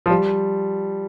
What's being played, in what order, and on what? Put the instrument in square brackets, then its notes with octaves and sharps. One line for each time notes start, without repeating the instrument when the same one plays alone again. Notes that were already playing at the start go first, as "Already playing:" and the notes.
[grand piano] F3
G3